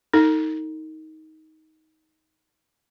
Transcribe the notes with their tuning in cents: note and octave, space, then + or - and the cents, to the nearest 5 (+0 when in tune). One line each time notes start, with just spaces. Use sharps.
D#4 +15 A4 +45